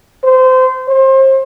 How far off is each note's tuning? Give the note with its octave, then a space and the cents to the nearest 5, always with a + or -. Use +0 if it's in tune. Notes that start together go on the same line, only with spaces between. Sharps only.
C5 -25
C5 +30